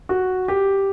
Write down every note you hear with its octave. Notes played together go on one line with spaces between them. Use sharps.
F#4
G4